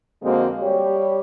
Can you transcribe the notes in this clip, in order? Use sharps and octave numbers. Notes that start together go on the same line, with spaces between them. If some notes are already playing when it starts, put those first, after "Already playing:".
F2 D3 G#3 A#3 C4 F#4
G3 G4 C#5